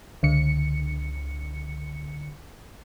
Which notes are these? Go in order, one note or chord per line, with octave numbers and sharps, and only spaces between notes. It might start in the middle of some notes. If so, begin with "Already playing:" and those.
C#2 D3 C#7